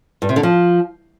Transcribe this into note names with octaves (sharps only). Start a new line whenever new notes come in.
G2
C3
D3
F3